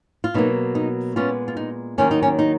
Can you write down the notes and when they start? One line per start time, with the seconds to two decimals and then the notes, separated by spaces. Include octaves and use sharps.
0.24 F4
0.34 B2 F#3 A#3 D#4
0.75 D#4
1.16 A#2 G#3 B3 C#4 F4
1.48 F4
1.57 D#4
1.98 D#2 D#3 F#3 A#3 C#4
2.11 D#4
2.22 C#4
2.39 D#4